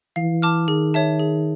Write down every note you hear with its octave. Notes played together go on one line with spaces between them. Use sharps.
E3 F5
A5 D6 F6
D#3 G#4
C#5 E5 A5
G#4